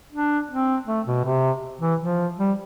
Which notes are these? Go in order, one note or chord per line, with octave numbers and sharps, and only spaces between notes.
D4
C4
A3
B2
C3
E3
F3
G3